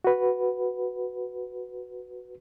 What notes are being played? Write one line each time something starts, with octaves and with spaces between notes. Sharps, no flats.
F#4 B4